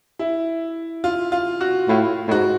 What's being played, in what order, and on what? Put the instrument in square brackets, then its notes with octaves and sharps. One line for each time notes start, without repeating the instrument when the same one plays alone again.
[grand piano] E4
F4
F4
F#4
[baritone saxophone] A2 [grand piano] F4
[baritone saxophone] A2
[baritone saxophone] G#2 [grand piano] F#4